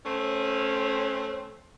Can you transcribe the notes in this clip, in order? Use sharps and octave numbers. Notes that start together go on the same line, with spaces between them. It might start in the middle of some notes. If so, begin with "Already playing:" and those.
A3 C4 C#4